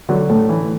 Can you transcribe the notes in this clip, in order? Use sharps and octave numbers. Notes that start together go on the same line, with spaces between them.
D3 F#3
A2 A3
E3